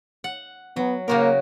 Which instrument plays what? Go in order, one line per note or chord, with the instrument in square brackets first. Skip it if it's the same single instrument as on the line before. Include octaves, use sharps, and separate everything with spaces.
[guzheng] F#5
[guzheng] F#3 [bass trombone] B3
[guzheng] C#3 F#4 A#4 [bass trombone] A#3